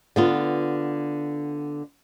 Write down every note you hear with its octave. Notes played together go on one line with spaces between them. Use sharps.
D3 B3 F4